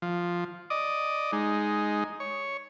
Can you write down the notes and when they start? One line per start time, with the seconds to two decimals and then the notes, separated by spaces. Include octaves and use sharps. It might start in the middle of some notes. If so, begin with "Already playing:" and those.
0.02 F3
0.70 D5 D#5
1.32 G#3 D#4
2.20 C#5